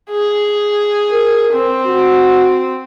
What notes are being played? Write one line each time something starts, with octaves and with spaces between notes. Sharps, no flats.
G#4
A#4
C4
F#4